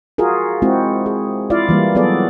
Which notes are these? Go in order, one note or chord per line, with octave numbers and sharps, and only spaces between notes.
F4 F#4 G#4 A#4
G#3 C4 E4 F#4
G#4
E4 F4 D5 F5
E3 G3 A#3
F#3 B3 F#4 G#4 A4 D5